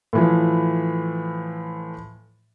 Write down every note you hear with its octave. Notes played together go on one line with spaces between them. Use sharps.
A2 E3 F3